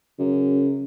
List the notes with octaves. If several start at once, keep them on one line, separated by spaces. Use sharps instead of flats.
F#2 C#3